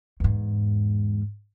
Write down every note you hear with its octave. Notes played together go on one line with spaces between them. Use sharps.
E2 G#2